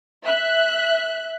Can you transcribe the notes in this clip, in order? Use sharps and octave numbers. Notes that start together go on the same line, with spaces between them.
E5 F#6